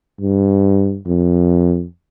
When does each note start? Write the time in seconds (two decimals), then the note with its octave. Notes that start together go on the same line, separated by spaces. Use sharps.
0.21 G2
1.07 F2